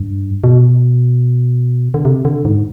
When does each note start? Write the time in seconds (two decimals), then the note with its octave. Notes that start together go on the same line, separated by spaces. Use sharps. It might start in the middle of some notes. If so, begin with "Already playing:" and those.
Already playing: G2
0.44 B2
1.94 D3
2.05 C3
2.25 D3
2.45 G#2